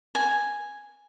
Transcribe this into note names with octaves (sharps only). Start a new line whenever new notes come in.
G#5